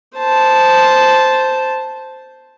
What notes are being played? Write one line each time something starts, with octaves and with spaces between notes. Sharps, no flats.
C5 A5